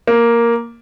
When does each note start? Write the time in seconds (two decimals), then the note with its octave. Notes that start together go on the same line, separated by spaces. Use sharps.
0.07 A#3